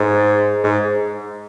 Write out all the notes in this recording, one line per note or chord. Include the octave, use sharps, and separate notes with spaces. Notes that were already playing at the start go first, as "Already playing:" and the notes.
Already playing: G#2
G#2